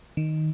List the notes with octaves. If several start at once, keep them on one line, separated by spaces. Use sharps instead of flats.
D#3